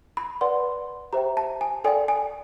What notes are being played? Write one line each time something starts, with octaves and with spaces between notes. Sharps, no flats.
B5
B4 D5 F#5 C6
G4 C5 E5 G5 A#5
A5
G#5
A4 D5 G5 G#5
G#5